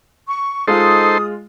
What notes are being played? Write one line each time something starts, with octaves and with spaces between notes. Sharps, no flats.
C#6
G#3 D#4 F4 A4 C5 D#6